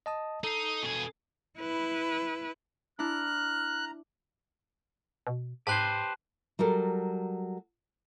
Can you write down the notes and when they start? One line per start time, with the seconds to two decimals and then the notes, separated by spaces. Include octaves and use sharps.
0.06 D#5 A5 D#6
0.44 D#4 A4 C7
0.82 B2 G#4
1.59 E4 B4
2.99 D4 E4 A#5 F6 F#6
5.27 B2
5.67 G#2 G4 B4 C5 A5 C6 F#6
6.59 F#3 G3 A4 A#4